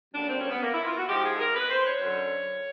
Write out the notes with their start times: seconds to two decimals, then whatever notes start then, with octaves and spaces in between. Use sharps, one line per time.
0.14 F#2 D3 G3 A#3 D4
0.28 C4
0.39 C#4
0.50 B3
0.62 A#3
0.73 E4
0.85 F4
0.96 F#4
1.08 G#2 F3 G#3 G4
1.23 G#4
1.35 A4
1.39 A#4
1.54 B4
1.70 C5
1.86 C#5
2.01 F#2 D3 F#3